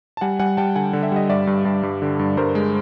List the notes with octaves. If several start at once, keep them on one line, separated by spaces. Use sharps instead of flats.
A5
G3 F#5 G#5
G3 F#5 G#5
G3 G5 A5
D3 F#5 G#5
D3
E5
G3 D#5
G2 D5 E5
G2
G2
G2
D3
G2
G2 A#4 C5
G#3